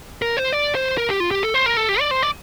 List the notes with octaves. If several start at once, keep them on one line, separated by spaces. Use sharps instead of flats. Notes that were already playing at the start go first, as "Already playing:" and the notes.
A#4
C5
D5
C5
A#4
G4
F4
G4
A4
C5
A#4
A4
G4
D5
C5
D5